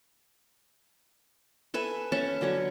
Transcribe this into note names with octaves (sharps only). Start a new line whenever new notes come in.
A4 B4 E5 G#5
C#4 E5 A5 C#6
D3 F#3 C#4 C#5